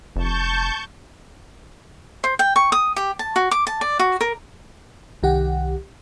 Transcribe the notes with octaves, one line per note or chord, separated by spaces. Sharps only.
F1 A5 C#6 G6
C5
G5
C#6
D#6
G4
A5
F#4
D6
A5
D5
F#4
A#4
C2 D#3 G4 F#5